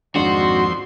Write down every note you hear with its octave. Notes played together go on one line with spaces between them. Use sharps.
G#1 F2 G#3 D4 F#4 C6